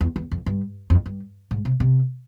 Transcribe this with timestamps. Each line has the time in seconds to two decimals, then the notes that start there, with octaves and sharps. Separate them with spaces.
0.01 E2
0.16 E2
0.31 F2
0.46 G2
0.90 F2
1.06 G2
1.51 G#2
1.65 C3
1.80 C3